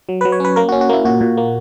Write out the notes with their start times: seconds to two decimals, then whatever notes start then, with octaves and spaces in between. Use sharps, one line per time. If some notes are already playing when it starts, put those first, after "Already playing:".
0.09 F#3
0.21 B4
0.25 F#3
0.32 C#5
0.40 C#4 B4
0.56 A#3 A#4
0.69 F#4
0.72 C#4
0.81 F#4
0.89 A#3 E4
1.05 A#2 F#4
1.21 A#2
1.37 A#3